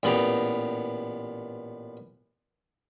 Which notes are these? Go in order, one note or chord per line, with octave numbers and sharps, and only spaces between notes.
A1 A#2 B3 G4 A#5